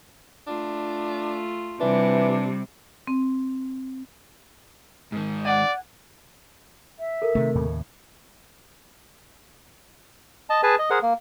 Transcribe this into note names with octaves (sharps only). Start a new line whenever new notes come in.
A3 D4 F4
C3 E3 G3 D4
C4
G#2 D#3
D5 F#5 G#5
E5
A4 A#4
C3 D#3 A3
D#2 A2 C#3
D#5 A5
G#4 B4 G#5 A5
D#5
G#4 A#4 C5 F#5
A#3